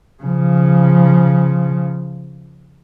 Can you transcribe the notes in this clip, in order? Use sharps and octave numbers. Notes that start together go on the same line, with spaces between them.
C#3 F3